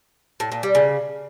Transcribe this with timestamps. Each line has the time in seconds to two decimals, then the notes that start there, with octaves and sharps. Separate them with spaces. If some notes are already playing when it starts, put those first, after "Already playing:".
0.40 A2
0.52 A#2
0.63 G3
0.75 C#3